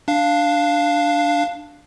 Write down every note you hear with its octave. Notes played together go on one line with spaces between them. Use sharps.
D4 F5